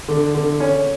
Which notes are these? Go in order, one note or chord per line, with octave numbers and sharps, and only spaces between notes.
D3
D3
C#4